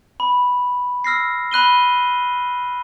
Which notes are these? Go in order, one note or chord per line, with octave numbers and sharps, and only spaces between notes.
B5
E6 F6 A#6 C7
B5 F#6 D#7 G7